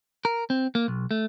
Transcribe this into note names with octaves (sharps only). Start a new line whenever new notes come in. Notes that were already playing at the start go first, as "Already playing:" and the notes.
A#4
C4
A#3
B1
A3